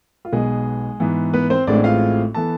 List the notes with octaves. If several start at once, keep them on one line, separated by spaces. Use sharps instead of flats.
F4
B1 B2 G#3 B3 G#4
G#2 E3 B3
B3 B4
C4 C5
A1 A2 G#3 C4 D4 D5
F4 F5
E3 B3 A4 A5